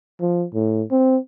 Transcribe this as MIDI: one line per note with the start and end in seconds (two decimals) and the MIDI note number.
0.20 0.45 53
0.54 0.83 45
0.91 1.17 60